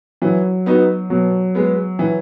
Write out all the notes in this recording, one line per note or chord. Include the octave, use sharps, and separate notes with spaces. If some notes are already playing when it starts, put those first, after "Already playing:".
E3 F#3
B3 D#4 F#4
B2 F#3
G#3 B3
E3